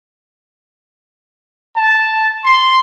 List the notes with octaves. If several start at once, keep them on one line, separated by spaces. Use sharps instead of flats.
A5
C6